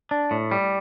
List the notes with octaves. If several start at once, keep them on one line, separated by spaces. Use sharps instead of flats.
D4
A2
G3